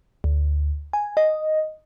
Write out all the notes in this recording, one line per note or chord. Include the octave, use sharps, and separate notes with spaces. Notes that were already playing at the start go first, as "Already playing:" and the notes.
D2
G#5
D#5